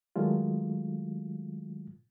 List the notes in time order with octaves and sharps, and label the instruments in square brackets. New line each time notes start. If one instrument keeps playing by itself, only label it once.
[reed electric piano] D#3 F#3 G#3 A3 F4